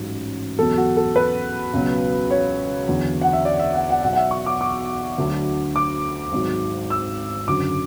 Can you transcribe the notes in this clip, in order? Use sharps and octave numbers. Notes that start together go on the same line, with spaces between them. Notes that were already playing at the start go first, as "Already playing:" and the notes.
Already playing: A1 G#2 F#3
E2 B2 F#3 A4
F#4
A4
B4
C#2 B2 F#3
C#5
E2 D3 F#3
F#5
E5
D5
E5
F#5
F#5
B1 B2 F#3 F#5
F#5
E5
C#6
D6
D6
D2 D3 F#3
D6
G#1 G#2 F#3
E6
F#1 F#2 D3 F#3 D6